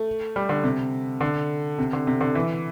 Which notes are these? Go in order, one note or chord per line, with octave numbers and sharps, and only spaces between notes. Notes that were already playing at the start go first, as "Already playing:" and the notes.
Already playing: A3
G3
D3
C3
D3
C3
D3
C3
D3
E3